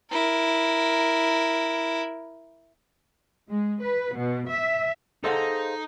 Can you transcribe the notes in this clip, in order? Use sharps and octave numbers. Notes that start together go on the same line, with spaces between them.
E4 A#4
G#3
B4
B2
E5
D#4 G#4 A4 C5 D#5 F5 F#5